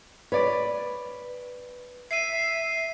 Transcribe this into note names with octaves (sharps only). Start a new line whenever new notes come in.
B4 C#5 D5
E5 C7 D#7